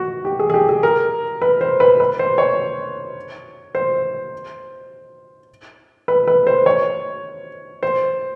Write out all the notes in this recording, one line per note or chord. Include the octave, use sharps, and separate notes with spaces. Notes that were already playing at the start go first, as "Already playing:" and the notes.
Already playing: F#4
G4
G#4
G#4
G4
G#4
A#4
B4
C5
B4
B4
C5
C#5
C5
B4
B4
C5
C#5
C5